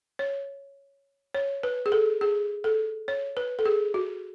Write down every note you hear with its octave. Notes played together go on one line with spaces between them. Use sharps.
C#5
C#5
B4
G#4
A4
G#4
A4
C#5
B4
A4
G#4
F#4